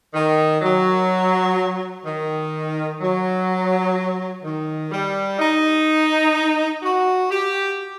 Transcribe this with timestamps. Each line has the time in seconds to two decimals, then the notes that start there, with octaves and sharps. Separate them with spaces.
0.14 D#3
0.62 F#3
2.05 D#3
3.01 F#3
4.44 D#3
4.92 G3
5.39 D#4
6.82 F#4
7.31 G4